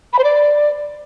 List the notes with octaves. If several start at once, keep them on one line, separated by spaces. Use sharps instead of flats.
B5
C5
D5